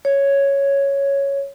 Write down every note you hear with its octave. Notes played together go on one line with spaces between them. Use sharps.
C#5